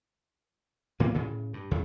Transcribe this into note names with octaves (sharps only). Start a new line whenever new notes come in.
A2 E3 A#3 B3
A2 C#3
G2
E2 C#3